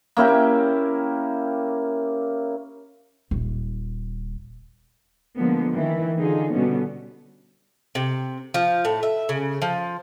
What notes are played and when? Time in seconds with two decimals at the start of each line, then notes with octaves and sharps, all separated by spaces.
0.17 A#3 C#4 E4 G4
3.31 D#1
5.37 D3 F3 G#3 A#3 B3
5.75 D#3 E3 E4
6.18 D3 D#4 F4 G#4
6.53 B2 D3 G3 B3 C#4
7.95 C3
8.54 F3
8.85 A2
9.03 E5
9.29 C#3
9.62 F3